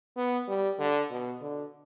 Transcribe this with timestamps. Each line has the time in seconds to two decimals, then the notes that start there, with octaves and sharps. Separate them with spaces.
0.17 B3
0.48 G3
0.79 D3
1.11 B2
1.41 D3